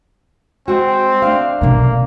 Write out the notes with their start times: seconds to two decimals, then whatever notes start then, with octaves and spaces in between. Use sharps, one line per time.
0.68 G#3 C4 F#4
1.22 A3 D4 F5
1.61 B1 D3 A#3